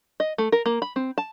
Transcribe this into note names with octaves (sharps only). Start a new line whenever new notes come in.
D#5
A3
A#4
A#3
B5
C4
A5